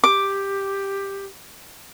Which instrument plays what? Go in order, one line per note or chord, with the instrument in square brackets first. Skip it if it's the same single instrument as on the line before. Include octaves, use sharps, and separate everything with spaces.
[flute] G4 [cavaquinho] D6